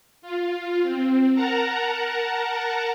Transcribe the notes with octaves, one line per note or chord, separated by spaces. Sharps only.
F4
C4
A#4 F#5 A5 A#5